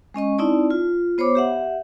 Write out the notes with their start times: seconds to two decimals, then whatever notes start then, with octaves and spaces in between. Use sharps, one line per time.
0.14 G#3 C#4 D#5 C#6
0.38 C4 D#4 E4 D5 A5
0.70 F4
1.18 B3 C5 C#5 B5 D6
1.35 G4 E5 F#5